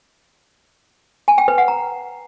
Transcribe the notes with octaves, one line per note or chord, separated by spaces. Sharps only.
G#5
G5
B4
F#5
A#5